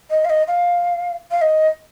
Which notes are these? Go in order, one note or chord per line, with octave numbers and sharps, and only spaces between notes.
D#5
F5
D#5
F5
F5
D#5